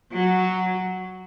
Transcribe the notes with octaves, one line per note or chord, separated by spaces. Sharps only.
F#3